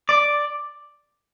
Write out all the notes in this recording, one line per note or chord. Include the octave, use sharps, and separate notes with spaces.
D5